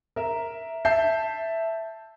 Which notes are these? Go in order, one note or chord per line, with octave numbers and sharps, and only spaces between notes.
A#4 E5
E5 A5 G6 C7